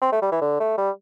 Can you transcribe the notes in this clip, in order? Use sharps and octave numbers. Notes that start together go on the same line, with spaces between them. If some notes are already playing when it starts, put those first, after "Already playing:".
C4
A3
G3
E3
D3
A3
G3